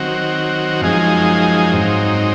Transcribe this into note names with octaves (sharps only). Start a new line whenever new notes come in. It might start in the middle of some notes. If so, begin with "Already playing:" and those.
Already playing: D#3 F#3 C4 F#4
F#2 F3 G#3 D#4 G#4
G#2 F#3 C4 D#4